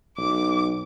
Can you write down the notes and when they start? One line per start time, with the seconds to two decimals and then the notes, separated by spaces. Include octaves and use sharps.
0.18 B1 D6